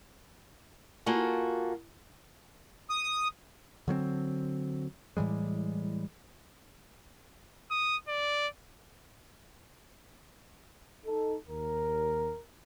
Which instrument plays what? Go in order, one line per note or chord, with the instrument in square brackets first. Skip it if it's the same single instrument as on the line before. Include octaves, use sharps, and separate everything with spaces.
[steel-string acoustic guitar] A#3 F4 F#4 G#4 A4
[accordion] D#6
[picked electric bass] D3 F#3 A#3 C4
A2 E3 G3 G#3
[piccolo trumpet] D#6
D5
[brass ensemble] D#4 A4
[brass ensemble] D#2 [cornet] A#4